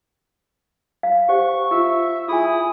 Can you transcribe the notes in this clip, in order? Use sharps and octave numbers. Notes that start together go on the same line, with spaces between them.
F5
G4 C5 F#5 C#6
F4 E5
E4 F4 G#4 G#5 D#6